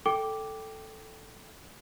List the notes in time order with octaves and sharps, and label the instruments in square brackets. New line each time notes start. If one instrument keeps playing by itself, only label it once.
[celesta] A4 G5 D6